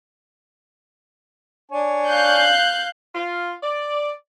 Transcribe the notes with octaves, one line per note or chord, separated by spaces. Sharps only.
D4 C#5 G#5
F5 F#6 G6
F4
D5